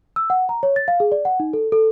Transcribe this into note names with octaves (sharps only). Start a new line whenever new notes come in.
E6
F#5
A#5
C#5
A6
F5
G#4
D5
F#5
D#4
A4
A4